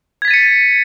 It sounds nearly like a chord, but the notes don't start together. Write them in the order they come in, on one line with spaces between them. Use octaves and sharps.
G#6 B6 A6 D#7 C#7